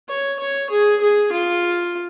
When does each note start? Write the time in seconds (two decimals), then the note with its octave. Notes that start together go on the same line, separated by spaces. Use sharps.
0.09 C#5
0.40 C#5
0.70 G#4
1.02 G#4
1.33 F4